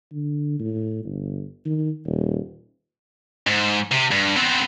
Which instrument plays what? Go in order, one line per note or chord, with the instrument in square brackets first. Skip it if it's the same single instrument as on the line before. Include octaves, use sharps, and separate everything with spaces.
[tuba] D3
A2
G1
D#3
D#1
[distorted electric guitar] G#2
C3
G2
B3 C4